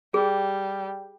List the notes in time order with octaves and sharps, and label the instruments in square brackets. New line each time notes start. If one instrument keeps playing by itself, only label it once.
[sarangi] G3 [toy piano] G#4